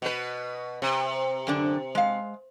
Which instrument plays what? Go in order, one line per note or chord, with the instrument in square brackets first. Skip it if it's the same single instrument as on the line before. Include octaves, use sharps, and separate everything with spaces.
[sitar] B2 B4
C3
[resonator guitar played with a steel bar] F#2 D3 D4
G#3 F5